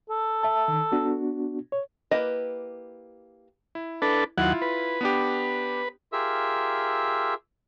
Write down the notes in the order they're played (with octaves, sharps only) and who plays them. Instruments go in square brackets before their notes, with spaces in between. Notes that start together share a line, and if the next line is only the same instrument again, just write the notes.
[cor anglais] A4
[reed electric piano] E5 A5
D#3
B3 D4 F#4
C#5
[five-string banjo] A#3 E4 G4 B4 D#5
[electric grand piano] E4
[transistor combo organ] D4 A4 B4
[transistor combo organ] D#2 F#3 F#5 [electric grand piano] E4 F4
[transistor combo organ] B4
[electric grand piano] B3 D4 G4
[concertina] F4 G4 G#4 A#4 E5 E6